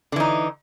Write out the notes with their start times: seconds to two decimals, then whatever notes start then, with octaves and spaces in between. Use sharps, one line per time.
0.12 D3
0.16 E3
0.20 D#4